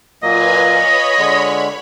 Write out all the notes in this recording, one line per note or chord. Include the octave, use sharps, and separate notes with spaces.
A#2 F#3 A#3 F4 B4 D#5 G#5
C#5 B5
D3 G#3